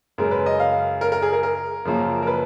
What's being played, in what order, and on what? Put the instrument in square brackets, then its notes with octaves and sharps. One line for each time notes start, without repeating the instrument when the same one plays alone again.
[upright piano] F#2 C#3 G#3 A#4
B4
D#5
F5
A#4
A#4
G#4
A#4
A#4
F#2 C#3 F3 A#3
A#4
B4